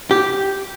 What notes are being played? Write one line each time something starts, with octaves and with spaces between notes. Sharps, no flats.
G4